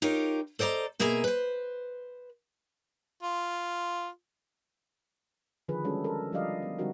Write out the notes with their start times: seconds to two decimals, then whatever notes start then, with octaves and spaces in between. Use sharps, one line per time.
0.02 D#4 F4 G4 A#4 C#5
0.59 A4 C5 D5 D#5 A#5
0.99 B2 A#3 G#4 E5 G#5 A#5
1.24 B4 C5
3.23 F4
5.68 D3 D#3 F3 G#4 B4
5.84 G3 G#3 C#4 D4 F#4 A4
6.04 A4 A#4
6.32 F3 G3 D4 D5 D#5 F5
6.63 B3
6.78 D3 G3 C4 D#4 F#4 A#4